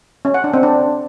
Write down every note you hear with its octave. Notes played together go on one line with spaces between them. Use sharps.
C#4
F#5
D4
C4
D4